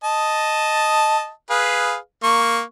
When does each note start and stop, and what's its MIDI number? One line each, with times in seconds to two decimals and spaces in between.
0.04 1.29 75
0.04 1.29 81
1.50 1.96 68
1.50 1.96 71
1.50 1.96 77
2.23 2.61 58
2.23 2.61 85